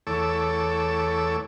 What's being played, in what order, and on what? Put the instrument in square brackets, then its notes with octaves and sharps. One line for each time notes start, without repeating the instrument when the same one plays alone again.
[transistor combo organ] E2 A3 A4 C#5 D6 E6